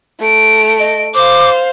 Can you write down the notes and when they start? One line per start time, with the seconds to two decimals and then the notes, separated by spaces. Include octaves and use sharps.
0.20 A3 D7
0.79 D#5
1.15 C5 F5 D6